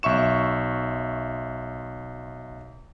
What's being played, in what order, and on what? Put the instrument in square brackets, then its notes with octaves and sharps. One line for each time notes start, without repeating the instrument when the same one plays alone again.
[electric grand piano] B1 E5 C#6 E7